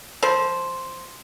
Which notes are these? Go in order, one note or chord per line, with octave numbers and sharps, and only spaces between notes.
F3 C5